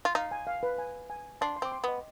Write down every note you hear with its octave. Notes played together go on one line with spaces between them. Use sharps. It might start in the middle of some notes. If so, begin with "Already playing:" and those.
F4
D#4 F5
G#5
F5
B4
G#5
G#5
D4 C6
C6
C4 D6
C6
B3 D#5